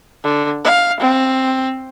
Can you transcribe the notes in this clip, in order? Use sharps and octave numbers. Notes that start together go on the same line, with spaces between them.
D3
F5
C4